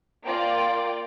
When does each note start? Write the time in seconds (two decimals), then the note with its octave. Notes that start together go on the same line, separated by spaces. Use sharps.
0.24 A#3 F4 D5 G5